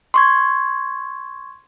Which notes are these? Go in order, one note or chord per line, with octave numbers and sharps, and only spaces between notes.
C6 C#6 G#6